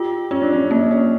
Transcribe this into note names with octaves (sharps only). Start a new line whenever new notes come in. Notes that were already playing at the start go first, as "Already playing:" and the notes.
Already playing: F4 G4
C#4 F4
D4
C#4
A#3 C#4
C#4